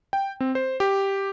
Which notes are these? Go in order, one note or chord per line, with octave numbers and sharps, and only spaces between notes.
G5
C4
C5
G4